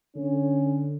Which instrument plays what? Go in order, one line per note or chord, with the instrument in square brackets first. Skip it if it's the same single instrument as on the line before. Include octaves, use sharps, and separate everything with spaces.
[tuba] D3 [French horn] C#4